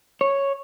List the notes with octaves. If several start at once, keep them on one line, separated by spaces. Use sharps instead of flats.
C#5